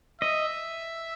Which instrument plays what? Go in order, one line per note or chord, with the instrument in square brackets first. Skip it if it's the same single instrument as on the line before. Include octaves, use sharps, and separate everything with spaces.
[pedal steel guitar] D#5 [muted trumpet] E5